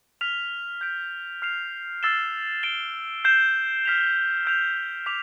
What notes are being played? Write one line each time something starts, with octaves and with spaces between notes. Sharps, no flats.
F6 B6 F7
G6 B6 D7
F6 C7 F7
E6 A6 C7 E7 G7
A6 D7 G7
G6 C7 E7 G7
F6 B6 F7
E6 G6 D7 F7
D6 G6 B6 F7